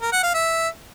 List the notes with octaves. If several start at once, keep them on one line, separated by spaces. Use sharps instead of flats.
A#4
F#5
F5
E5